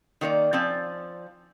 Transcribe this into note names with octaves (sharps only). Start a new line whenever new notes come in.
D#3 A#3 C5 D5
F3 C4 D5 G#5